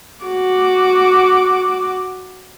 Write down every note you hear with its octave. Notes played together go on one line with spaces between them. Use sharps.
F#4 D6